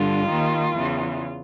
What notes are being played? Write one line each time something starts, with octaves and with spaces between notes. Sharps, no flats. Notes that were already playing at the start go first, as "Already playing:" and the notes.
Already playing: G2 D3 F4
D#2 D#3
E2 C#3 E3